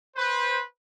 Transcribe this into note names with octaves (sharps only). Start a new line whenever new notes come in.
B4 C5